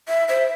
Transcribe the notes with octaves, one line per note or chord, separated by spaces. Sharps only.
E5
C5 E5